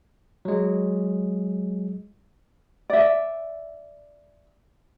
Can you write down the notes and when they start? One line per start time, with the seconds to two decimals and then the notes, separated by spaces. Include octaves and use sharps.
0.45 F#3 G#3
2.90 D5 E5